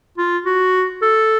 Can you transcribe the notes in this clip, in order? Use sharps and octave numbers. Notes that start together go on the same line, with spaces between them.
F4
F#4
A4